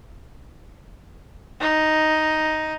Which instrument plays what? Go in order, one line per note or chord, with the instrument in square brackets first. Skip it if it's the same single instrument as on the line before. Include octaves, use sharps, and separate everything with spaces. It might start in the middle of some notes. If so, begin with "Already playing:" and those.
[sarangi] D#4